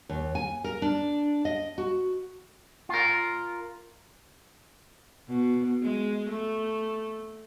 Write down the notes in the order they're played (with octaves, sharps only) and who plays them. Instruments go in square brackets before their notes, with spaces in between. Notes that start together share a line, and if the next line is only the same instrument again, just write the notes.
[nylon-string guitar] D#2
G#5
A#4
D4
D#5
F#4
[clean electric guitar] F4 A#4
[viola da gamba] B2
G#3
A3